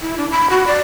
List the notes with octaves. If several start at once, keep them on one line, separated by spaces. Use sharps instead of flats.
E4
D4
B5
F#4
D5